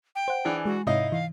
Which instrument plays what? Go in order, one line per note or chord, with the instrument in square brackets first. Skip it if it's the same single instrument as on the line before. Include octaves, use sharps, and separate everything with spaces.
[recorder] G5
[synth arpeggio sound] C5 F#5
[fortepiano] E3 D4 G#4
[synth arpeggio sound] G#3 [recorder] F#4
[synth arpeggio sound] G#2 C3 [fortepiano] D#4 E4 D#5 [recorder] F5
[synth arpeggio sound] E3 [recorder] F5